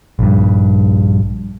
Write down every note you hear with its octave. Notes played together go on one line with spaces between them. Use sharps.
A#1 G2